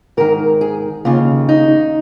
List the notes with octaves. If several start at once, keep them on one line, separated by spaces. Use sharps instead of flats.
G#2 D#3 A#4
G#4
D#2 C#3 F4
D#4